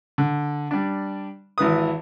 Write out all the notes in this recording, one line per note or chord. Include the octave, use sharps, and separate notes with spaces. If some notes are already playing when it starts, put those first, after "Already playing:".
D3
G3 D4
G#1 E3 B4 D#6